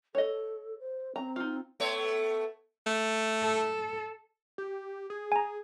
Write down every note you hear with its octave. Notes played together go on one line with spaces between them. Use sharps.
A4 C#5 D#5
C5
C4 A#5
D#4 F4
A3 B3 C#5
A3
A4
G4
G#4
G#5 A#5